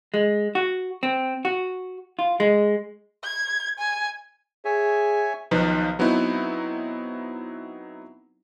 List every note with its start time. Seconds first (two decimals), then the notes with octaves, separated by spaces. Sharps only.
0.14 G#3
0.55 F#4
1.03 C4
1.45 F#4
2.19 F4
2.40 G#3
3.23 G#6
3.80 G#5
4.65 G#4 C#5 E5 G#5
5.51 B1 D#3 F3 D#4 B4
5.99 F#3 B3 C4 D#4 E4